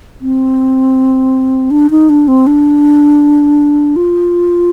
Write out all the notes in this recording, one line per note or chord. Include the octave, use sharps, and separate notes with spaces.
C4
D4
D#4
D4
C4
D4
F4